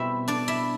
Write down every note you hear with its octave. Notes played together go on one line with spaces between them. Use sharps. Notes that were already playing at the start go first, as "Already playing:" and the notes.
Already playing: B2 G3 C4 E4 E5
D4 D5
E4 E5